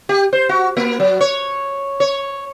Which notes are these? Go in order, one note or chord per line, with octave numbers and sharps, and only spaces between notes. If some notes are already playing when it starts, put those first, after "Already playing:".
G4
C5
F#4
A#3
F#3
C#5
C#5